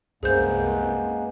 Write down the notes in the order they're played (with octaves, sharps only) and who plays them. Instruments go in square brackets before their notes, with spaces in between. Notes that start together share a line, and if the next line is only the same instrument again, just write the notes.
[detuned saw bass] C2 [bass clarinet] F#2 [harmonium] G#3 A#3 B3 [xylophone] G#4 C5 G6